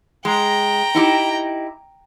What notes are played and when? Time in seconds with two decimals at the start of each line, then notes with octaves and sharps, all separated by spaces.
0.25 G#3 G5 A#5
0.95 D#4 E4 G4